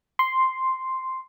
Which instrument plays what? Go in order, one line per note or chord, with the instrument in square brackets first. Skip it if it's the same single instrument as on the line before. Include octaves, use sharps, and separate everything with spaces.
[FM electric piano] C6